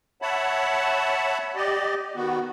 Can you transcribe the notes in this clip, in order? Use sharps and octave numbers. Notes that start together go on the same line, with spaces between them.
C#5 E5 F#5 A5 B5
G4 D5 D#5
D#3 B3 F#4